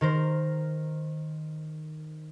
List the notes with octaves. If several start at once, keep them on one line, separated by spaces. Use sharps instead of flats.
D#3 A#4 C5